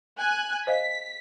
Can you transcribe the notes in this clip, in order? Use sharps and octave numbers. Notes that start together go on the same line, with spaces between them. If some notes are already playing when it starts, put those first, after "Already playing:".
G#5 F#6
C5 D#5 F5 B6